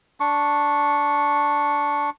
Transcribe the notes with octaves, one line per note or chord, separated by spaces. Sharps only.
D4 C#6